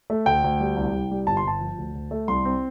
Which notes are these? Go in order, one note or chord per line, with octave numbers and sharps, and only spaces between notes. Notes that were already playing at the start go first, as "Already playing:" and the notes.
A3
D2 G5
D2
G3
C2
C2
G3
G1 A5
C6
G1 A5
F3
D2
D2
A3
C2 C6
C4